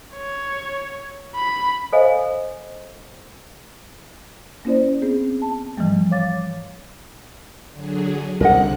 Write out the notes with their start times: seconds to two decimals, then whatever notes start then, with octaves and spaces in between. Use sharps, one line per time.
0.15 C#5
1.35 B5
1.93 A4 C5 D#5 F5 G#5 B5
4.65 A#3 C#4 E4 C5 D5
5.02 B3 C4 G#4
5.42 A5
5.77 G#2 E3 F3 G3 A3
6.11 C#5 F5 D6 A6
7.72 D3 F#3 G#4
8.40 C2 G#2 D3 A#4 D#5 F#5 F#6